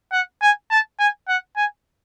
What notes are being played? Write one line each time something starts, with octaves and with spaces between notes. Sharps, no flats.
F#5
G#5
A5
G#5
F#5
G#5